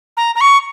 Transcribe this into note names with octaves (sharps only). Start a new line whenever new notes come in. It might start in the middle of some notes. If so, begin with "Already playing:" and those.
A#5
A#5
C#6